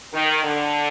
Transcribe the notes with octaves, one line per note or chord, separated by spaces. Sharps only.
D#3
D3